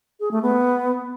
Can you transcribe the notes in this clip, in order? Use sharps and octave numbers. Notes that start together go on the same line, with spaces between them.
G#4
A3
B3